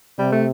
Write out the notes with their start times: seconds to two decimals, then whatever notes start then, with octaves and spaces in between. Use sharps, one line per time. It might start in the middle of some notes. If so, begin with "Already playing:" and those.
0.19 C3 G3
0.32 A3